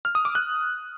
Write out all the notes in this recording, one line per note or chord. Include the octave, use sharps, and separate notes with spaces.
F6
D#6
D6
F#6